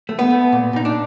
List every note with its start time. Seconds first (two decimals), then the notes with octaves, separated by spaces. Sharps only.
0.09 A3
0.19 B3
0.30 A3
0.52 A#2
0.73 A#2 D#4
0.85 D4